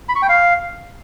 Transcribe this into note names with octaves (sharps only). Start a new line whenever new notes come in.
B5
C#6
G5
F5